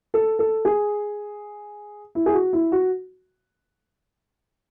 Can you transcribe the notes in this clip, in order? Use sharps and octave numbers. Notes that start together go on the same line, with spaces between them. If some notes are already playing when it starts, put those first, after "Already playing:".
A4
A4
G#4
E4
G#4
F#4
E4
F#4